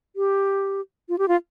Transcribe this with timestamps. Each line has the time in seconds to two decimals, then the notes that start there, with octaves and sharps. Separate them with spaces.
0.16 G4
1.09 F4
1.18 G4
1.28 F4